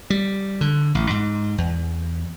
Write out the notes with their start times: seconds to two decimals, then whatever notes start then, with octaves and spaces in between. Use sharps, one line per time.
0.10 G3
0.61 D3
0.95 A1
1.10 G#2
1.58 E2